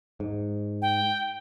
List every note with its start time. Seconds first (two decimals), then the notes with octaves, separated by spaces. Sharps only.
0.20 G#2
0.82 G5